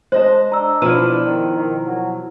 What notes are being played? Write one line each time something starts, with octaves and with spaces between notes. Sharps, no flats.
G#3 C5 D#5 A5
D4 A#5 E6
B2 F3 E4 B4 F6 D#7
D#3
D#3
F#3